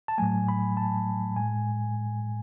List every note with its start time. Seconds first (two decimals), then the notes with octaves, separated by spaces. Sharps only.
0.08 A5
0.18 A2 F#3 A3 G#5
0.49 B5
0.77 A5
1.36 A2 G#3 G#5